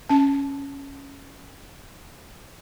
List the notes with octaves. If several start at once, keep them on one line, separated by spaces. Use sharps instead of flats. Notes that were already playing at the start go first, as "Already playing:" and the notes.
C#4 A5